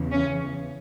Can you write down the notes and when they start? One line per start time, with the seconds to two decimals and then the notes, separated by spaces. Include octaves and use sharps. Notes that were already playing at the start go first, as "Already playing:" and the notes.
Already playing: E2 C#3 E3
0.11 C#4